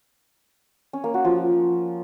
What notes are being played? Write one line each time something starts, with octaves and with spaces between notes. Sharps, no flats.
C#4
A#3
F#4
F3